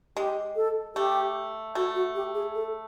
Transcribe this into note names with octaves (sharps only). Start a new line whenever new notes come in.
G#3 G4
A4
A3 G4
A3 F#4
F#4
G4
G#4
A4